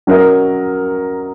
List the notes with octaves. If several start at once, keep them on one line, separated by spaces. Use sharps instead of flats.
F#3 C#4 A#4 D#5